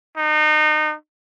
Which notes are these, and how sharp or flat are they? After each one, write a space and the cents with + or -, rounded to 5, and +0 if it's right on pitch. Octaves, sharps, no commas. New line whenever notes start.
D#4 -30